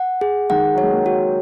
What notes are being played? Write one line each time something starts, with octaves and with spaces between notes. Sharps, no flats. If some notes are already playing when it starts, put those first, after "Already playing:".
Already playing: F#5
G#4
D#3 G#3 F#5
F#3
C#5
G#3
F#3 A#3
F#4